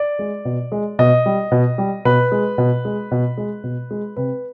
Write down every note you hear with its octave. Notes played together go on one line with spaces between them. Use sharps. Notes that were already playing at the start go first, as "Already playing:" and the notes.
Already playing: D5
G#3
B2
G#3
B2 D#5
G3
B2
G3
B2 B4
G#3
B2
G#3
B2
G#3
B2
G#3
C3 B4